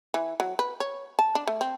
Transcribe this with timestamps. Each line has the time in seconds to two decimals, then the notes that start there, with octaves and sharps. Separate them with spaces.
0.14 E3
0.40 F#3
0.59 B4
0.80 C#5
1.19 A5
1.35 D4
1.47 A3
1.61 C4